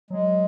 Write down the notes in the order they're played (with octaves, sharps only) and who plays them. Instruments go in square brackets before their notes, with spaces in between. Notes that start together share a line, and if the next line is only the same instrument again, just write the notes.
[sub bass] F#3 [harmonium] G#3